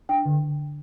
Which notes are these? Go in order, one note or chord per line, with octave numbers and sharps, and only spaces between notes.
D4 G5
D3